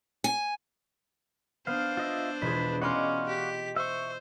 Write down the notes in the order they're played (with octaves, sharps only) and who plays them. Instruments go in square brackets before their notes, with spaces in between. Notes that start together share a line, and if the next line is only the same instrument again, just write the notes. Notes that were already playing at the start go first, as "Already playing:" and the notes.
[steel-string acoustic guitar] G#5
[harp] B3 [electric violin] D4 C5 [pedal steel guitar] F5
[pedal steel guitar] F4 D#5 E5
[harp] E1 F4 G#4 [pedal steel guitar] B4
[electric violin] C#4 [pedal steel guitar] F#4 D5 F5 [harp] D#5 B5 C6
[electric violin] G4 B6
[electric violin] C5 [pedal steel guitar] E5 C#6